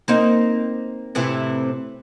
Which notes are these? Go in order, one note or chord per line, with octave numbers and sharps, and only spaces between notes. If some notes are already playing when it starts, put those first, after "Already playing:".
A#3 C4 D#4
A2 C3 E3